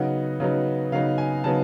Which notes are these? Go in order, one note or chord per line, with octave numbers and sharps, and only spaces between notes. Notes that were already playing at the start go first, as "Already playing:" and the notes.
Already playing: C#3 F#3 B3 D#4 F#5
C#3 F#3 B3 D#4
C#3 F#3 B3 D#4 F5
G#5
C#3 F#3 B3 D#4 A5